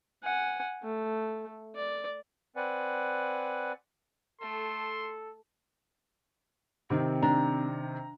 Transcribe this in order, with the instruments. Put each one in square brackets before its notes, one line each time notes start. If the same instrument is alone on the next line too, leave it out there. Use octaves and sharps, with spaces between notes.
[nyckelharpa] F#5 G#5
A3
D5
[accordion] C4 B4 D5 F#5 G#5
[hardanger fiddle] A3 [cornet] A4 [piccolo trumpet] C6
[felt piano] C3 D#3 [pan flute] C4
[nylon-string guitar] D4 [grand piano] A#5